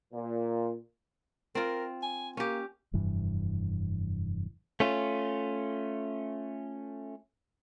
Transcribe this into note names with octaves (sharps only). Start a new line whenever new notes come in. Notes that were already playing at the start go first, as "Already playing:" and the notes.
A#2
C4 F4 A#4
G#5
A#3 C#4 G4
F1 G2 E3
A3 C#4 F4